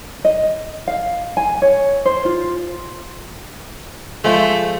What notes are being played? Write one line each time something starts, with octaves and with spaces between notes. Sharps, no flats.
D#5
F5
G#5
C#5
C5
F4
F3 G#3 A3